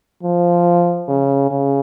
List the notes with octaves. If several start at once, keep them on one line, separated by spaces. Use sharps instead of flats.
F3
C#3
C#3